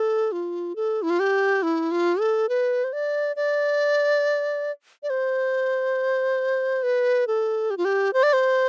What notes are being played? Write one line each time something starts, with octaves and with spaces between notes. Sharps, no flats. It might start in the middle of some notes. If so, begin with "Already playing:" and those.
Already playing: A4
F4
A4
E4
F4
G4
E4
F4
A4
B4
C5
D5
D5
D5
C5
B4
A4
G4
F4
G4
C5
D5
C5